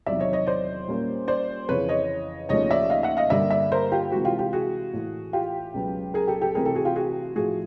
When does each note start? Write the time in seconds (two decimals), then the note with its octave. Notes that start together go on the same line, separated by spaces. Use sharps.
0.06 E2 C3 D#3 F#3 D5 E5
0.19 C#5 D#5
0.33 C#5 D#5
0.47 C5 D5
0.88 A#2 G3 A#3 C#4
1.28 C5 D5
1.68 F2 C#3 E3 B4 C#5
1.89 C#5 D#5
2.49 D#2 C#3 F3 A3 C#4 C#5 D#5
2.71 D5 E5
2.90 D#5 F5
3.03 E5 F#5
3.17 D#5 F5
3.30 G2 D3 G3 A#3 D5 E5
3.50 D5 E5
3.72 A#4 C5
3.92 F4 G4
4.12 C3 E3 G#3 F#4
4.25 F4 G4
4.39 F4 G4
4.53 F#4 G#4
4.93 A2 E3 A3
5.33 F4 G4
5.74 C#2 B2 F#3 B3
6.14 G#4 A#4
6.27 G4 A4
6.41 G4 A4
6.55 C3 E3 A3 C4 G#4 A#4
6.65 G4 A4
6.75 F#4 G#4
6.85 F4 G4
6.96 F#4 G#4
7.36 A2 F3 A3 F#4 G#4